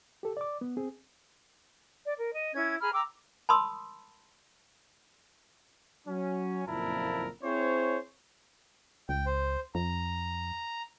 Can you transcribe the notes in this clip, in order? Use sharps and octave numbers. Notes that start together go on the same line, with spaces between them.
G4 A4
D5 D6
B3
C4 G#4
D5
A#4
D#5
C#4 E4 G#6
G#4 A#5 B5 F6
G5 A#5 D6 E6
A5 B5 C6 D#6 E6
F#3 C#4
F#1 F2 A#2 E4 A#4 A5
C4 E4 G#4 C5 C#5
C#2 G5
C5
F2 A#5